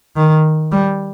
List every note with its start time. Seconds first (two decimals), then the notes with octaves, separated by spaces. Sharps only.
0.16 D#3
0.72 G3